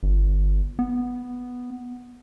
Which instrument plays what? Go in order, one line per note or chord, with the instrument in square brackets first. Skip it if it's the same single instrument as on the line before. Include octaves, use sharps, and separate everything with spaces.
[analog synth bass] G1
B3